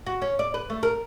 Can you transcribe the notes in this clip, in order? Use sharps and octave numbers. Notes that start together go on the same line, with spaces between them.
F#4
C#4
D5
B4
A3
A#4